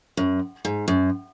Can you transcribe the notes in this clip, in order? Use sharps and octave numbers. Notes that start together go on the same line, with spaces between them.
F#2
G#2
F#2